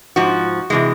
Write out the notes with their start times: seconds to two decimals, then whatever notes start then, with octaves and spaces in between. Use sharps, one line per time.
0.16 G#2 F3 F#4
0.70 C3 E3 G#3